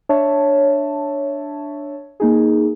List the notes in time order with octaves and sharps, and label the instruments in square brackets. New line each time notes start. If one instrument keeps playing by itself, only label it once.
[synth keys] D4 C#5 E5 A5
A#3 D#4 G#4